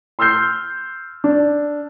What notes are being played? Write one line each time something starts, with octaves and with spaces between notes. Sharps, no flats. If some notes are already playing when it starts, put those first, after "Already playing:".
C6 E6 F6 G6 C7
D4